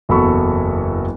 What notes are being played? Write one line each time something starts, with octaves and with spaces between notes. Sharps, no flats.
F#1 E2 F#3 A4 B5 C#6